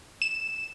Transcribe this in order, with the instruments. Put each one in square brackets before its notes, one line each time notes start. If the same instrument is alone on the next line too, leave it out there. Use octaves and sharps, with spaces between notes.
[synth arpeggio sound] E7